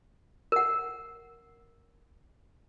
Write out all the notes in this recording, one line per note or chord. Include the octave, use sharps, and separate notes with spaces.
A#4 F#5